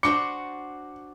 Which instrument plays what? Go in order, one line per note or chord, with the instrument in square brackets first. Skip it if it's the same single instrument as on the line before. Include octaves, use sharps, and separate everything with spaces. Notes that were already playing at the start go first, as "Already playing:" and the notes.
[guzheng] D4 F#4 C5 [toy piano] D6 [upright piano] C#7